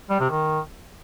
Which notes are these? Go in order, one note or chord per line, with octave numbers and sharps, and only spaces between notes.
G3
C3
D#3